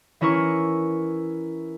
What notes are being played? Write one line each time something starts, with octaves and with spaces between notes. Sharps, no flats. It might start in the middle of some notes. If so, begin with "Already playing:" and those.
E3 C#4 E4 A#4 C#6